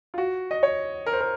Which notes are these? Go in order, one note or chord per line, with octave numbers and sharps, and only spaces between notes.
F4
F#4
D#5
C#5
A#4
C5
A#4